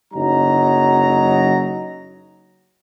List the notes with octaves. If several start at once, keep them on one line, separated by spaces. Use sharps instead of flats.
F#1 F#3 D#4 A#5